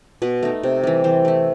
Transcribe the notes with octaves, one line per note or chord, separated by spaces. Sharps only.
B2 B4
A3 D#4
C3
E3 G3
E3 C5
A3 E4